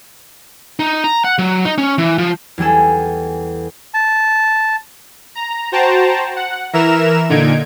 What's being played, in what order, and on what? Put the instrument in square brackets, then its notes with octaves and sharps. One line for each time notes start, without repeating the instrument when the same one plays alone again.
[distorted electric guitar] D#4
A#5
F#5
F#3
D#4
C#4
E3
F3
[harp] E2 G3 G#4 A4
[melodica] A5
[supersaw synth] A#5
F#4 C5 G5 A5 A#5
F#5
E3 A#4 E5 A#5 F6 E7
A#2 D3 D#4 G#6 D7